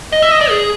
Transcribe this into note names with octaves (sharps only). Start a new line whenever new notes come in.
D#5
E5
D#5
D5
G#4